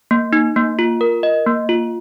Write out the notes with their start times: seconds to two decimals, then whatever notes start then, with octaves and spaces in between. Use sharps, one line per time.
0.11 A#3
0.33 D#4
0.56 A#3
0.79 F4
1.01 A#4
1.23 D#5
1.47 A#3
1.69 F4